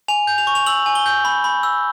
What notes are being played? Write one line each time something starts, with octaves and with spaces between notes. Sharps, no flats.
G#5 F7
G6
F7
C#6
F7
E6 F#7
G#5
G7
G6
B5
B5
E6